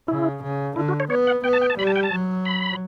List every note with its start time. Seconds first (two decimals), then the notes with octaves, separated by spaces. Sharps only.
0.08 C#3 E4
0.43 C#3
0.76 D3 E4
0.89 F#4
1.00 C#5
1.10 B3 C#5
1.27 F#5
1.44 B3 G5
1.53 A5
1.61 G5
1.70 A5
1.78 G3 B5
1.87 A5
1.96 G5
2.03 A5
2.12 F#3
2.45 B5